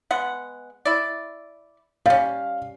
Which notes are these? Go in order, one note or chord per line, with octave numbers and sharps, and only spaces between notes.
G#3 B3 F#5
E4 D5
G3 C#4 F5